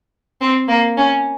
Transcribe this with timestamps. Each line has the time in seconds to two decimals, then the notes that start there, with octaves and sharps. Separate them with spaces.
0.41 C4
0.68 A#3
0.97 C#4